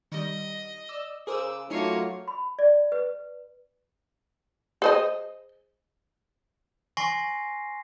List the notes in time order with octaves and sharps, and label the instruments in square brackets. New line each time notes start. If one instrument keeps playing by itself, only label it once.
[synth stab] D#3 G3 [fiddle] D#5
[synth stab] D5 E6
[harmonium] C#3 [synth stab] G#4 A#4 C5 [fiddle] D6 E6
[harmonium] F#3 A3 F4 [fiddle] A#3 C#5 [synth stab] C#4 D#4 C7
[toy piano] B5
D5
B4
[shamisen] G#4 C5 D#5
[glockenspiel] G#5 C6 C#6 A#6 C7